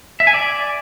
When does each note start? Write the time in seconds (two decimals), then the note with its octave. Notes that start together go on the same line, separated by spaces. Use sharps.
0.20 E5
0.27 G#5
0.34 D5